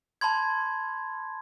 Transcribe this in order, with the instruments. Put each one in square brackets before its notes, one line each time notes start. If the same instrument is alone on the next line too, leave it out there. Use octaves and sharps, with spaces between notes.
[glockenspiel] A5 B5 C6 G#6